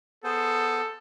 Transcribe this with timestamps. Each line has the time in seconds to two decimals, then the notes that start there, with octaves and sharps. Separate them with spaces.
0.24 B3 G#4 A4 C5